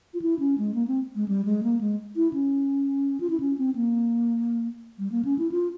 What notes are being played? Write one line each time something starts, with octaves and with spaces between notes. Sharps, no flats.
F4
E4
C#4
G#3
A#3
C4
G#3
G3
G#3
A#3
G#3
E4
C#4
F4
E4
C#4
C4
A#3
G3
A#3
C#4
E4
F4